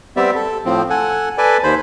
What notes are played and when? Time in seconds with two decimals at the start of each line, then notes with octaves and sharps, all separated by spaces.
0.16 G3 B3 C4 G4 D5 E5
0.35 A4
0.65 A2 F3 C4
0.90 A4 F#5 G#5
1.38 A4 B4 D5 G#5
1.63 D#2 C5 B5